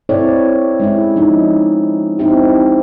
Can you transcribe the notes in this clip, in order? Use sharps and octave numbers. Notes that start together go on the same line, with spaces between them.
C4 E4 A4 C#5 D5
G#3 C#4 E4
F3 D#4
C4 D#4 E4 G4